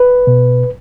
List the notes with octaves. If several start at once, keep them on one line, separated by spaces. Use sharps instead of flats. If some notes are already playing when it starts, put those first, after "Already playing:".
Already playing: B4
B2